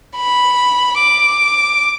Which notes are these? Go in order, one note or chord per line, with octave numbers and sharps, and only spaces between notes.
B5
D6